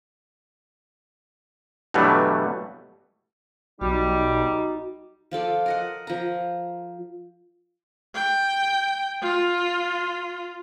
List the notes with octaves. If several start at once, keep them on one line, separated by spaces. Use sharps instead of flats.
G2 B2 E3 F#3 G3 A3
B1 G3 D#4 F#4
F3 F4 A4 D5
A#4 D#5 F#5
F3 A#5
G5
F4